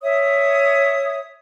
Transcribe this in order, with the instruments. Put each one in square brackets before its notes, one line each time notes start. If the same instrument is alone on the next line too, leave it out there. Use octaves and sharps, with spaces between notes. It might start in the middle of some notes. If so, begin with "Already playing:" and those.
[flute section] C#5 E5 D#6